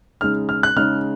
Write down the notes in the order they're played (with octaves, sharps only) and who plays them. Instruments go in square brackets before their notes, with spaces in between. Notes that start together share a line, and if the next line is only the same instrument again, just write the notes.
[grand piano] C#3 G#3 D#4 F6
F6
F#6
C#3 G#3 D#4 F6